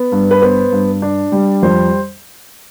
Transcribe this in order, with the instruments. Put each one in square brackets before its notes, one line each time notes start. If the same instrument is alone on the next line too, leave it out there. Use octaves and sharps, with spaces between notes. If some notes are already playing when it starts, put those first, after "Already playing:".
Already playing: [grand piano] B3
G2
B4
B3 C5
G2
D4
G3
F2 C5